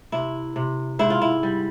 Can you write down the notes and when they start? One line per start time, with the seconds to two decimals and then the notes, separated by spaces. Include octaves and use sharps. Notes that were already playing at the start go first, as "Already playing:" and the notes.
0.12 C3 E4
0.56 C3
0.99 G#2 E4
1.10 F4
1.22 E4
1.43 G3